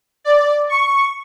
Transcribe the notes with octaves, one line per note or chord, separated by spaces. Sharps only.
D5
C#6